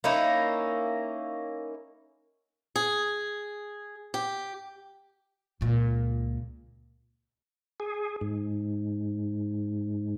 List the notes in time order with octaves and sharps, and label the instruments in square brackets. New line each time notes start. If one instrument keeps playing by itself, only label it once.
[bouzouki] A#3 C#4 D#4 E4
[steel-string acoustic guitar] G#4
G4
[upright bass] C#2 A#2
[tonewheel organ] G#4
G#2